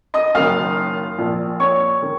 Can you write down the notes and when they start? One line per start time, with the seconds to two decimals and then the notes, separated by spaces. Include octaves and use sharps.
0.14 D#5 D#6
0.35 F#1 F#2 D#3 F5 F6
1.18 A#1 A#2 F3
1.60 C#5 C#6
2.02 D#3